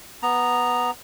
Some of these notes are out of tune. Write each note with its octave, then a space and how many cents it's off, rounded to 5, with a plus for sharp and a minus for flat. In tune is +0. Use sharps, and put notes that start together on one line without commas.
B3 +0 A#5 +0